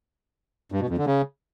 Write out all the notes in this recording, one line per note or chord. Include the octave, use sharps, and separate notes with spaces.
G2
B2
F2
D3
C#3